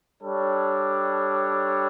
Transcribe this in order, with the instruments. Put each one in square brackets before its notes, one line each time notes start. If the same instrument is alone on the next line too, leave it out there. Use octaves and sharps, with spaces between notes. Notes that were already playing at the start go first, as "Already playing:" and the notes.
[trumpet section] G3 D4 A4 C#5